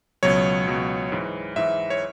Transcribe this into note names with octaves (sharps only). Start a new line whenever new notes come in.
C#2 B2 F#3 C#5
C#2 B2 F#3
G#2 E3
G#2 E3 E5
C#5